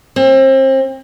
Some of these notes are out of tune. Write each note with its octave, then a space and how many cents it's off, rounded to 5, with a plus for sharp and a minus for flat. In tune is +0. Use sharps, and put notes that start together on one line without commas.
C4 +35